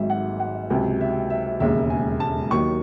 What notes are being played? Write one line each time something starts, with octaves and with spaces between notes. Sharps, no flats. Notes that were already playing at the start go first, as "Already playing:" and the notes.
Already playing: G#1 G#2 F#3 E5
F#5
F#5
C#2 C3 F#3 G#5
E5
E5
E1 D#2 C#3 G#3 E5
G#5
A5
D#2 D#3 F#3 C#6